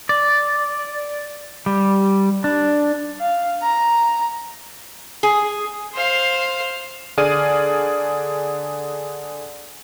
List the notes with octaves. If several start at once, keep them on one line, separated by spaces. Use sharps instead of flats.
D5
G3
D4
F5
A#5
G#4
C5 F5
D3 G#4 D5 F6 D#7